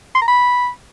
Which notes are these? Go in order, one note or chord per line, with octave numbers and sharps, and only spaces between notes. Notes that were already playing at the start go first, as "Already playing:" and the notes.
C6
A#5
B5